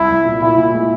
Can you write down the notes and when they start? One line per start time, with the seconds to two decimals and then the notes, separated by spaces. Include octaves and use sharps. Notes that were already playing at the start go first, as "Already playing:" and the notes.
Already playing: C2 E4
0.10 C2
0.25 A#2
0.42 A#2 E4
0.58 A#2
0.74 G#3